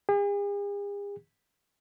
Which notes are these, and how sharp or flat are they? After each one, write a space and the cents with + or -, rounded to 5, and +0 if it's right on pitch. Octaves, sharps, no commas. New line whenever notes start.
G#4 -45